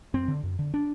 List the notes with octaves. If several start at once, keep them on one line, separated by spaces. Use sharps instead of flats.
F#2 C4
D3
F#2
D3
D4